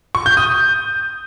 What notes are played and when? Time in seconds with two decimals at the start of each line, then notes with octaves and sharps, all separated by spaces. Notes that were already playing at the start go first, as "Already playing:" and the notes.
0.15 C#6
0.26 G6
0.37 D#6